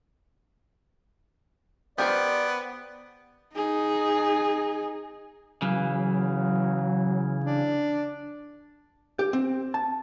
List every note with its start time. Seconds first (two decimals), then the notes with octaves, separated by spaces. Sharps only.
1.98 B3 G4 A#4 C5 D5
3.54 D#4 G#4
5.62 C#3 E3 F#3
7.44 D4
9.19 G4
9.33 C4
9.74 A5